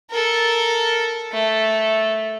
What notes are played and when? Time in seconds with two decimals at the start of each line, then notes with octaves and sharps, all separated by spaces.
0.10 A4 A#4
1.32 A3